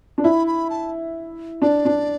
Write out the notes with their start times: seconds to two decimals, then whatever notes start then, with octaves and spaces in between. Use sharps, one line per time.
0.18 D4
0.24 E4 B5
0.47 B5
0.70 A5
1.62 D4 D5
1.85 D4